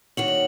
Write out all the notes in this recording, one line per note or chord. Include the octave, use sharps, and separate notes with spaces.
D#3 A#3 F#4 C#5 F#7
F#7